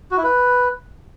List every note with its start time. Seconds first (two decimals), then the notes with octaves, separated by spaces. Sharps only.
0.11 F#4
0.18 E4
0.24 B4